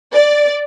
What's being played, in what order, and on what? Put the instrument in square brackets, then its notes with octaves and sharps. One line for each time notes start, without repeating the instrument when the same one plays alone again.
[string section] D5